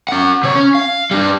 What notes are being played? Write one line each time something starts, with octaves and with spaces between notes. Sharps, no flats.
C#4 F#5
C3 C#5
C#4
F5
G3 D4